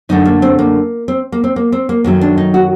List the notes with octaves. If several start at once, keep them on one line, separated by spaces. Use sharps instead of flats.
F#2 D3 A3 D#4
A#3
C4
A#3
C4
A#3
C4
A#3
C4
A#3
F#2 D#3 F#3 A3 A#3
D4
D#4
F#4